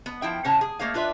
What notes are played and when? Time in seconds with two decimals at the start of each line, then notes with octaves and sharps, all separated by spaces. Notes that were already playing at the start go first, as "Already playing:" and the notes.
0.06 B3
0.22 F3 E4 G5
0.44 A2 C#3 C#5 A5 A#5
0.61 G#4
0.79 A3 A#3 G#4 C#5 F5
0.94 D4 F4 B4 D5 E5